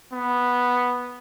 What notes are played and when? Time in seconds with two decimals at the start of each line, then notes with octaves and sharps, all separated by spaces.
0.13 B3